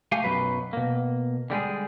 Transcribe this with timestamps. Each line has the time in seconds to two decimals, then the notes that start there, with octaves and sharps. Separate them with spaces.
0.12 A3 G4 F5 G#5
0.24 B1 F#2 F#3 B4
0.73 B2 A#3
1.50 D3 G3 G#3 G#4